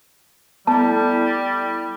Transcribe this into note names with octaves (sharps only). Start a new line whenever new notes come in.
G3 A3 B3 E4 A5